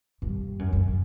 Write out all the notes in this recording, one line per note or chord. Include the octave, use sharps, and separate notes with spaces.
G2
F#2
F#2